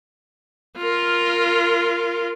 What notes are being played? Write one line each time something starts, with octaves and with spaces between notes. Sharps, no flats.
F4 A#4